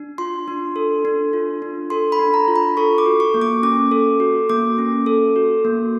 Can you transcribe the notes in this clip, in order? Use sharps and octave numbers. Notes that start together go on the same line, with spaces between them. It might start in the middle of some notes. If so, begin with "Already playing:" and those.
Already playing: D4
F4 C6
D4
A4
D4
F4
D4
A4 C6
B5
D4
A#5
F4
B5
A4 C#6
D6
F#4
C#6
A#3
D6
C#4 D6
A4
F#4
A#3 D6
C#4
A4
F#4
A#3